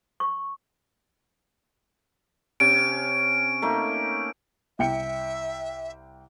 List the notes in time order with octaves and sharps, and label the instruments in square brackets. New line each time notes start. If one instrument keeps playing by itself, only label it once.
[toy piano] C#6
[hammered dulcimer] C3 C#4 [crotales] D7
[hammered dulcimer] A3 A#3 D#4
[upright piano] C2 G5 C#7 [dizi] E5